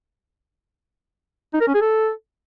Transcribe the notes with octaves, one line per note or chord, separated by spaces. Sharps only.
D#4
A#4
C#4
G#4
A4